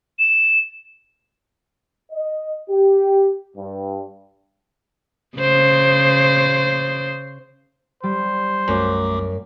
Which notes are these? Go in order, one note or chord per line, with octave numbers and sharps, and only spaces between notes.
E7
D#5
G4
G2
C#3 C5
G3 C5
B1 F#2 A3 D6